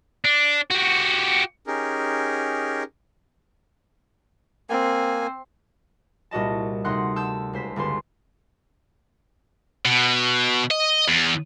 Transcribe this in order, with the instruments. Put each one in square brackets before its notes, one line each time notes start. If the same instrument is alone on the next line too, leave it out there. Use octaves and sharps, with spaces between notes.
[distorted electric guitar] D4
F#4 G4
[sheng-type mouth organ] C#4 D#4 G4 G#4 A#4
[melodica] A#3 G#5 [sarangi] C4
[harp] C2 A#2 F#4 D#5 A5
D2 C3 D#4 F#5 C6 F#6
A5 E6 G6
C#2 C5 B6
G1 C#2 A4 C6
[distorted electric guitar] B2
D#5
E2